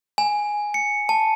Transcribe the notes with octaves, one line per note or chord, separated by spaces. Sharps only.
G#5
C#7
A5